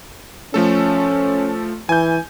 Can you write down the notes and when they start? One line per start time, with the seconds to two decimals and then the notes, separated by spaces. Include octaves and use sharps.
0.54 F3 A3 C#4 A4
1.89 E3 G#5 G6